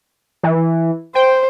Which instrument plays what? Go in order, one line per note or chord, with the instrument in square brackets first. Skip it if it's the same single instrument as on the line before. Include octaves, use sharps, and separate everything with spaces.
[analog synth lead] E3
[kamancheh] C5 [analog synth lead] G5